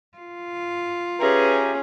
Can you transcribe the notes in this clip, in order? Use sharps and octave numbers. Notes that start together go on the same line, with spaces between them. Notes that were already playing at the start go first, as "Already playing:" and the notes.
F4
C#4 G4 G#4 B4 E5 A#5